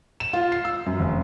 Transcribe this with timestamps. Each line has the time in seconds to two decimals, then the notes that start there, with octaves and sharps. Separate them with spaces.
0.20 E7
0.33 F4
0.52 C7
0.65 E6
0.86 F#2
1.00 F1